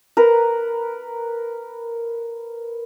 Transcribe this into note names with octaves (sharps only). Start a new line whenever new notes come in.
A#4 B4